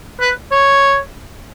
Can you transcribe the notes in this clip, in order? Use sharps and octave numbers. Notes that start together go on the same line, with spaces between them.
B4
C#5